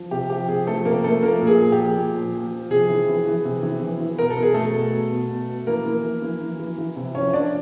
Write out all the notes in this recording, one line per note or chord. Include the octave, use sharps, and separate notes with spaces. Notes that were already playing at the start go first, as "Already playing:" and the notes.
Already playing: F3
C3 G4
F3 G4
C3 G#4
F3 A3 A4
C3 A#3 A#4
F3 A3 A4
F3 A#3 A#4
A#2
G#4
F3
G4
F3
A#2
F3
F3
F3
C3 G#4
E3
E3
E3
C3
E3
E3
E3
B2 A#4
A4
B2
G#4
B2 A3 A4
B2
B2
B2
B2
B2
E3 A#3 A#4
E3
E3
E3
E3
E3
E3
C3
F3 C#4 C#5
F3 D4 D5